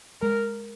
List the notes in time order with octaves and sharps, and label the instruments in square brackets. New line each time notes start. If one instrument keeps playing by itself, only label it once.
[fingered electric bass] G#3 [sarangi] A#4